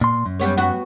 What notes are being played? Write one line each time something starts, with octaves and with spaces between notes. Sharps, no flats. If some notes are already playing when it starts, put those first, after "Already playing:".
A#2 C6
F#2
G3 B3 C#4
B3 F#4